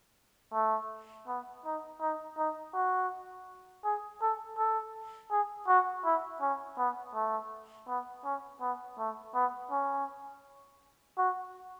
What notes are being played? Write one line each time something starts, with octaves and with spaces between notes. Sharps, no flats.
A3
B3
D#4
D#4
D#4
F#4
G#4
A4
A4
G#4
F#4
E4
C#4
B3
A3
B3
C#4
B3
A3
B3
C#4
F#4